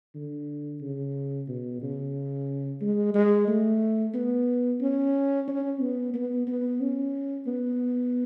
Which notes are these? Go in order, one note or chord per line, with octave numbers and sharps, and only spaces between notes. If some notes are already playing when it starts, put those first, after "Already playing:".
D3
C#3
B2
C#3
G#3
G#3
A3
B3
C#4
C#4
B3
B3
B3
C#4
B3